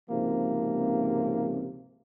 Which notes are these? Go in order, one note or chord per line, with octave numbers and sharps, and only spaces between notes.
G#1 C#2 G#2 C3 F3 A#3